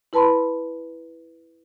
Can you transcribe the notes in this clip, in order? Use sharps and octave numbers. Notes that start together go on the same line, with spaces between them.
E4 B4 A5 B5 C6